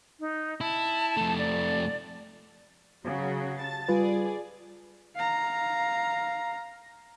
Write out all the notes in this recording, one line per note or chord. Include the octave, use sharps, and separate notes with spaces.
D#4
E4 A5
F2 A3
D5
C#3 F#3 F#4
A5 A6
G3 F4 G#4 B4 D5
F5 A#5